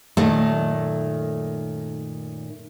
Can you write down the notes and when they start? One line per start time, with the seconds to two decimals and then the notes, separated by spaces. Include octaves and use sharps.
0.17 F#2 A#2 D#3 A3